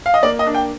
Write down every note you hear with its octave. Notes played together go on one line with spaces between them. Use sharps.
F5
D#5
A#3 D5
D#5
D4
G5